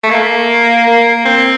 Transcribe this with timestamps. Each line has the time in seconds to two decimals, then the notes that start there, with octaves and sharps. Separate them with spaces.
0.04 A3
0.11 A#3
0.87 A#3
1.25 C4